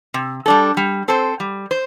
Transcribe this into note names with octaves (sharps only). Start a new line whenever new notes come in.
C3
G3 D4 A4
G3
C4 A4 C5
G3
C5